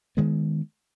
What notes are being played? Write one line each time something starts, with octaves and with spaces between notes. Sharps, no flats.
D#3 G#3 B3